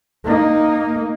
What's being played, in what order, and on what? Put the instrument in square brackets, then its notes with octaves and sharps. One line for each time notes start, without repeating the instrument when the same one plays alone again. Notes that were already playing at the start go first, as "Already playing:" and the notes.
[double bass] A#3 D#4